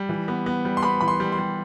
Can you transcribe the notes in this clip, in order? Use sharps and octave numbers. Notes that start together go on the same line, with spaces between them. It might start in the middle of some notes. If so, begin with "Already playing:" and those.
Already playing: G3
E3
B3
B3
G3
C6
B3 B5
E3 B5
C6
G3
C6
G3